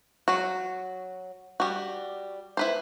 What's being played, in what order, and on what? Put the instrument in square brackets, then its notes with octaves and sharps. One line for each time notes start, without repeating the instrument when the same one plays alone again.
[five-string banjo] F#3 F#4
G3 F#4
E4 B4 C5